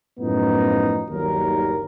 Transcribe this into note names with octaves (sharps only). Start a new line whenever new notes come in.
F#2 A2 F3 B3 D#4
G1 D#2 D#3 F#3 A#4